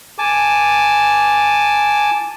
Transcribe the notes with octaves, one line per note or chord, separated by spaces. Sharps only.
G#5 A5 D6